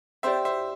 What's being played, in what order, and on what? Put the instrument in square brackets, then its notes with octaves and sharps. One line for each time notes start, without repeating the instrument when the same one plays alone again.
[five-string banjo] C4 G4 D5 [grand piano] C5 E5
[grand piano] C5 E5